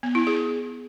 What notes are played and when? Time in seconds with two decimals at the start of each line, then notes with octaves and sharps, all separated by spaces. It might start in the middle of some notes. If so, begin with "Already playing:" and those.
0.03 B3
0.15 E4
0.27 G#4